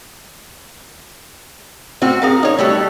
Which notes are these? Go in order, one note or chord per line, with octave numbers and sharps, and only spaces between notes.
A2 C4 F#4
G#4 A#4 F5
D#4 C#5
G3 A3 F#4